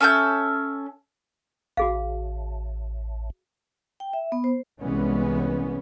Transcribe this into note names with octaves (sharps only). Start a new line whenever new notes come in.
C#4 A4 E5 G6
A1 F#4 G#4 F5
G5
E5
B3
C5
C2 E3 G#3 B3 C#4